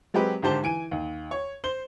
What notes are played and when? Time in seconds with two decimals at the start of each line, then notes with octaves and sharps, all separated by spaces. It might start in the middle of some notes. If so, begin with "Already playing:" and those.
0.14 F#3 G#3 C4 G4 B4
0.42 G#1 D3 G4 C5 A5 G7
0.63 E3 G#5 D7 D#7
0.91 D#2
1.31 C#5
1.64 C5 C6 G7